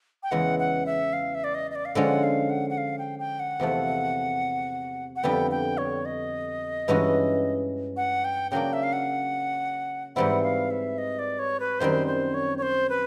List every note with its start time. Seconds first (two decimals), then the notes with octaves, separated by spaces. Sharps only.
0.23 G5
0.31 E2 C#3 E3 G#3 F#5
0.59 F#5
0.86 E5
1.13 F5
1.35 E5
1.44 D5
1.55 D#5
1.71 D#5
1.75 D5
1.85 F5
1.95 D3 F3 G#3 C#4 F#5
2.24 F5
2.50 F#5
2.70 F#5
2.78 F5
2.99 G5
3.19 G5
3.40 F#5
3.60 E2 C3 F3 A3
5.16 F#5
5.23 F2 D3 G3 B3 G5
5.51 G5
5.78 C#5
6.05 D#5
6.88 G2 E3 G#3 C#4 F#4
7.97 F#5
8.25 G5
8.51 C#3 F#3 A#3 D4 G5
8.73 E5
8.83 F5
8.93 F#5
10.16 G#2 E3 G3 C4 E4 F#5
10.44 F5
10.70 E5
10.98 D#5
11.19 D5
11.39 C#5
11.60 B4
11.80 F#2 D#3 G3 C4 C5
12.07 C5
12.34 C#5
12.58 C#5
12.62 C5
12.90 B4